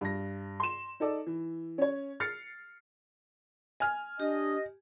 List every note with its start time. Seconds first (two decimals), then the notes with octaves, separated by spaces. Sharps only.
0.01 G2 A#6
0.60 C6 E7
1.00 D#4 A4 D5
1.26 E3
1.78 C#4 C#5
2.20 F6 A6 C7 C#7
3.80 G#5 F6
4.20 D4 G4 D#5